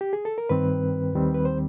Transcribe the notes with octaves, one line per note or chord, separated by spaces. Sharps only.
G4
G#4
A4
A#4
G2 D#3 G3 C4 B4
D#2 D#3 G3 C4
B4
C5